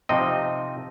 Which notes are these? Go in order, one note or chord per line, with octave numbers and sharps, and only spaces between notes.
C3 F3 C4 D#4 D#5